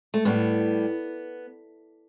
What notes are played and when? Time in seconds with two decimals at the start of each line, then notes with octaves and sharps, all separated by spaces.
0.14 A3
0.25 A2 G3 B3